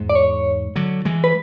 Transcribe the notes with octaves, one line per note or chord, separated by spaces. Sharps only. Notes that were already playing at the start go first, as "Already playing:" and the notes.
Already playing: E2 G#2
D5
C#5
D3 F#3
E3 G#3
B4